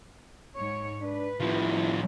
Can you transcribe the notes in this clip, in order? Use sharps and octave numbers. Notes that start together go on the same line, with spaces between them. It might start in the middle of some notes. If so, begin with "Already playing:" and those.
G#2 C#5
D4 B4
A2 F3 E4